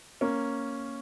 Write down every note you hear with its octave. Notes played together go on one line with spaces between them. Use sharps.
A#3 C#4